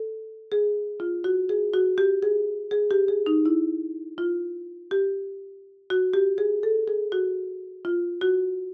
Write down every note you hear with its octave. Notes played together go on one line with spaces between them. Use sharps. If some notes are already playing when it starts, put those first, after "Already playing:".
Already playing: A4
G#4
F4
F#4
G#4
F#4
G4
G#4
G#4
G4
G#4
D#4
E4
F4
G4
F#4
G4
G#4
A4
G#4
F#4
F4
F#4